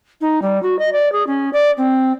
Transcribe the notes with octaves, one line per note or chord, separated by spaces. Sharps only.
D#4
G3
F#4
D#5
D5
G#4
C#4
D5
C4